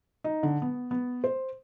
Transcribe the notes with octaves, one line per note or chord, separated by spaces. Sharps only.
D#4
D3
B3
B3
C5